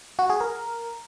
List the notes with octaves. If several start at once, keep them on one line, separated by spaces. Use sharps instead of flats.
F#4
G#4
A#4